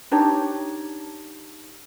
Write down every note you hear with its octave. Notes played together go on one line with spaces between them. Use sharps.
D4 D#4 G4 C#5